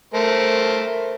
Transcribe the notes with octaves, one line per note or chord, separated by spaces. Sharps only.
A3 A#4 C5